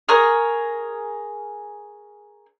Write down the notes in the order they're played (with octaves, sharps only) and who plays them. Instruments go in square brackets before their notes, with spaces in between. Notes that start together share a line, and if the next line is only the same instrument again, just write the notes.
[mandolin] G#4 A#4 C#5